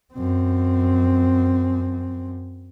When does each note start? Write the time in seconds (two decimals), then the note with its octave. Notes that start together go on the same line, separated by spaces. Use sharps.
0.14 F#2 C4